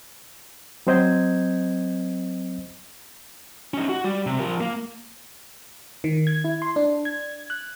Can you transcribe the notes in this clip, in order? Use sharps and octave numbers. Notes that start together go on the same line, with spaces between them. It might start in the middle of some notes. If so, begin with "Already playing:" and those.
F#3 C4 C5 D#5 G6 G#6
C#4 D#4
F#4
G3
C3
F3 A#4
A#3
D#3
G#6
E4
C6
D4
G#6
F#6